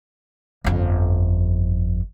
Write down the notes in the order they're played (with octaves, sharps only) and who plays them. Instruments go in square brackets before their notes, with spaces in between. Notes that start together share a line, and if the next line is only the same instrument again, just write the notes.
[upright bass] G1 F2